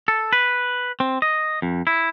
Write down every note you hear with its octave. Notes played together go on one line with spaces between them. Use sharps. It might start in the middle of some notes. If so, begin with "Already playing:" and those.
A4
B4
C4
D#5
F2
E4